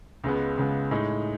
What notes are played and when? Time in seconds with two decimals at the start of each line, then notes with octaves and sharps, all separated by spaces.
0.24 C#2 C#3 G#3 B3
0.58 C#2 C#3 G#3 B3
0.91 A2 G#3 D#4